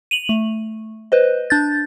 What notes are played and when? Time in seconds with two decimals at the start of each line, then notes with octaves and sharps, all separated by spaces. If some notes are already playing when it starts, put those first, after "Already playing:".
0.11 D#7 F7 F#7
0.29 A3
1.12 B4 C5 D#5
1.50 D4 G6 A6